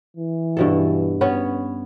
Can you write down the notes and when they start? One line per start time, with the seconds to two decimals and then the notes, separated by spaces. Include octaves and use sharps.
0.17 E3
0.57 G2 B2 A4
1.21 B3 C#4 C#5